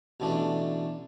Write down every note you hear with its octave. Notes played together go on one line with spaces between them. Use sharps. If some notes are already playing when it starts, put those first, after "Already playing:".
A1 B2 D3 A3 D4